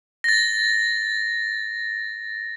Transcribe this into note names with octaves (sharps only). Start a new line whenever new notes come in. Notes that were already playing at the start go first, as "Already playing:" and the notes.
A6 A#6